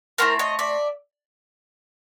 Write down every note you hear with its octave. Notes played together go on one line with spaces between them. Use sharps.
A3 C4 E4 A#4 C5
C#5 D#5
D5 E5